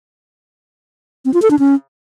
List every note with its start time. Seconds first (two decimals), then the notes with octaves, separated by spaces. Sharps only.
1.25 C4
1.34 F4
1.42 A4
1.51 D4
1.59 C#4